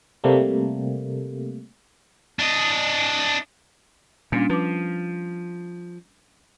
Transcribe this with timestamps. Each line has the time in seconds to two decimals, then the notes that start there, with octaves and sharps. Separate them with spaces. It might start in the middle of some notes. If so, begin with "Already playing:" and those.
0.24 C3 G3 A3 A#3
2.39 D4 D#5
4.32 A#2 G3 C#4 D4
4.50 F3 B4 D6